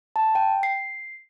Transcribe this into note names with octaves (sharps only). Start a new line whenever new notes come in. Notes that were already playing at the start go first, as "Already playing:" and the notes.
A5
G5
C7